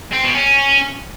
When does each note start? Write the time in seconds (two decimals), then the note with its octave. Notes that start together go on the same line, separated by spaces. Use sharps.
0.12 C4
0.23 B2
0.35 C#4